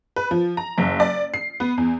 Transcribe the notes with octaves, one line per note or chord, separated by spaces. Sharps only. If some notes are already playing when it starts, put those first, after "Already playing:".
B4
F3
A#5
F#1
D5
C7
B3
E2